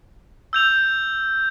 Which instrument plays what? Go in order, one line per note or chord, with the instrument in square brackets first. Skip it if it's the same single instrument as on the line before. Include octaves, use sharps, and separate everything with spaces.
[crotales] E6 G6 F7